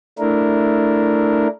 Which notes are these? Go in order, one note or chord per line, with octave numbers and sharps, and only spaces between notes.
A3 D4 E4 A#4